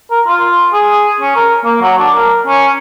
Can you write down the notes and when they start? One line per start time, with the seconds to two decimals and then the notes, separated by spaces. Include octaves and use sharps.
0.11 A#4
0.27 F4
0.73 G#4
1.21 C#4
1.36 A#4
1.64 A#3
1.82 F#3
1.98 D4
2.15 A#4
2.47 C#4